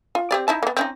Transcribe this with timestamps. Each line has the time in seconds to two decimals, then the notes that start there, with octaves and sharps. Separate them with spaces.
0.15 F4
0.31 C4 G4 D5
0.48 D#4 E4 A5
0.63 A#3 B3
0.77 C4 C#4 D#4